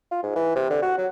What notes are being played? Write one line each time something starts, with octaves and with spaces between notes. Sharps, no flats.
F4
G#2
E3
C3
D3
F#4
F#3